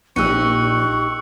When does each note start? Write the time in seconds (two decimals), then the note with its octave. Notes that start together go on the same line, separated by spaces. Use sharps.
0.16 A#1 D#4 G4 C#6 E6 F#6 C#7